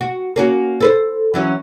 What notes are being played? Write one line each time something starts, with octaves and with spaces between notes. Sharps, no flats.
F#4
A#3 C#4 F#4
A4 B4 C5
E3 F#3 C#4